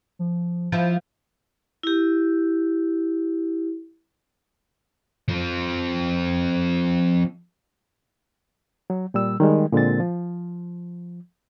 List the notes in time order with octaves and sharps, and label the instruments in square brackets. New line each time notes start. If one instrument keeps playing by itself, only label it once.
[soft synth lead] F3
[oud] F3 E4
[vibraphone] E4 G4
[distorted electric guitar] F3 C4
[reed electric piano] F#3
A#2 G3 E6
D#3 G3 G#3
A#2 D3 G#3 C4 A6
F3